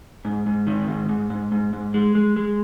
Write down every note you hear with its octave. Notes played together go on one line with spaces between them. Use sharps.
G#2
G#2
D#3
G#2
G#2
G#2
G#2
G#2
G#3
G#3
G#3